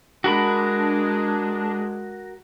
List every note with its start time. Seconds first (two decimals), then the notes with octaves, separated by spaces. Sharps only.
0.24 G#3 D4 F#4 A#4 B5